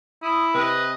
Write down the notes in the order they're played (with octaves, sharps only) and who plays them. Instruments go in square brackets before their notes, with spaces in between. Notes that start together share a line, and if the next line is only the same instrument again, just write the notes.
[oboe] E4 [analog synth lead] D#6
[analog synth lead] C3 [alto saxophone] B4 [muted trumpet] D#5